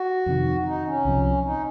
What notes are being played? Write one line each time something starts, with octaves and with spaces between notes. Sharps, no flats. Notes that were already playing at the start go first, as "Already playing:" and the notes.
Already playing: F#4
F2 C3 D#3
D#4
C#4
C2 C3 F3
D#4